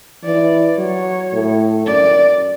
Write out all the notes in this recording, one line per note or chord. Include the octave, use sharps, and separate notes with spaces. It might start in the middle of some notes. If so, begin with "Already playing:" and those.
E3 D5
F#3 C#5
A2
F#2 D5